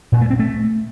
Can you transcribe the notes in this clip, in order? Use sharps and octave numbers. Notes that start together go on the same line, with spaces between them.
A#2
A3
C4
A3